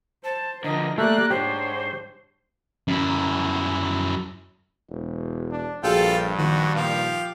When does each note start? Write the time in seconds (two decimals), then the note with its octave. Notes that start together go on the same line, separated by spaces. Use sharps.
0.24 C5 A5
0.64 D3 F3 D4 A#4 D#5
0.98 A3 A#3 G4 D5 F#6
1.30 C2 G#2 D4 G4 C5 C#5
2.88 F#2 E4
4.90 E1
5.51 D4
5.84 A#1 G2 F4 F#4 G#4 A4 G5
6.38 A#1 D#3 F#4
6.75 A#2 F3 G4 F5